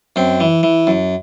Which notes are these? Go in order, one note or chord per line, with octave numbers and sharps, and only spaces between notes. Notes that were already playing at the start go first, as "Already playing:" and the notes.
F#2 C4
E3
E3
F#2